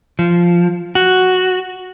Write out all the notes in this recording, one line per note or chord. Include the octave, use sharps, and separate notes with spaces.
F3
F#4